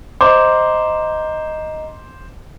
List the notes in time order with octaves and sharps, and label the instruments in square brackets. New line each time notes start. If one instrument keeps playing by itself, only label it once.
[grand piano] C5 [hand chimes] D#5 A#5 C6 [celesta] D6